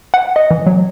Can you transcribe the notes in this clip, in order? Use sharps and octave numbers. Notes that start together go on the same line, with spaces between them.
F#5
D#5
E3
F#3